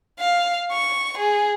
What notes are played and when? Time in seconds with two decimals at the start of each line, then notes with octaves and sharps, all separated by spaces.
0.20 F5
0.72 C#6
1.18 G#4